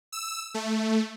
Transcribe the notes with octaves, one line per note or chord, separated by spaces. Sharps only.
E6
A3